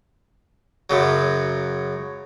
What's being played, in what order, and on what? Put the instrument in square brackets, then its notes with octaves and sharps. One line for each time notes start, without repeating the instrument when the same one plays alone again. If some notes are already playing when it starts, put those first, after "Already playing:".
[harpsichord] F#2 C#3 F#3